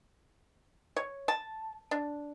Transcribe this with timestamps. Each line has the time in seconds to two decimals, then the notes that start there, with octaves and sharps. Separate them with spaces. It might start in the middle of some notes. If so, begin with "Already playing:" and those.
0.96 C#5
1.28 A5
1.91 D4